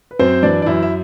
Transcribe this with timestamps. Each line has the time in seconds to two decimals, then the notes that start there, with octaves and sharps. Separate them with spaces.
0.11 B4
0.19 F#2 C4 C5
0.43 E3 D4 D5
0.62 D5
0.66 F#2 E4 E5
0.83 E5